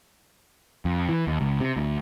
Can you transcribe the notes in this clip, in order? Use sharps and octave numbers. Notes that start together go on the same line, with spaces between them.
F2
E3
D#2
C#2
C3
D2